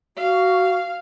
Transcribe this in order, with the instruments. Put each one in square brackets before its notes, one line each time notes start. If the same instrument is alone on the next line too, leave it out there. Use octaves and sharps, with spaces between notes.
[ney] F#4 [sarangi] F5